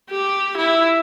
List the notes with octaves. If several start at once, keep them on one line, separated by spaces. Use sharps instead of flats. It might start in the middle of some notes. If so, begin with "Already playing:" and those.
G4
E4